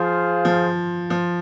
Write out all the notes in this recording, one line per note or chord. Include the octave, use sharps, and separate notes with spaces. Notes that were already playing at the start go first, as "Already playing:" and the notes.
Already playing: F3 F4 G#4 C5 F5
F3
F3